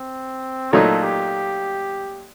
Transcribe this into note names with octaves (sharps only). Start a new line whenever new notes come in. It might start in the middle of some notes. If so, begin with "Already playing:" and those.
Already playing: C4
A#2 F#3 A3 D#4 A4
G4